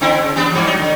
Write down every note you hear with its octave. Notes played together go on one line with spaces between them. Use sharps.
D3 C4 E4
C#3
G3 B3 D4
G2 F3
F#3 D#4
D3